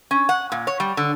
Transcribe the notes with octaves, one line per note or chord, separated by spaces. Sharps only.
C#4
F#5
A#2
C#5
G3
D3